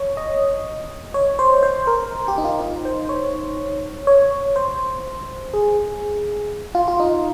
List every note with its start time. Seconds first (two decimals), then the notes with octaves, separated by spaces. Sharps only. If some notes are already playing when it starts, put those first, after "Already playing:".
Already playing: C#5
0.17 D#5
1.14 C#5
1.39 C5
1.63 C5
1.87 A#4
2.28 G4
2.38 D#4
2.44 F4
2.61 D#4
2.85 C5
3.09 C#5
4.07 C#5
4.56 C5
5.53 G#4
6.75 F4
6.88 F4
7.00 D#4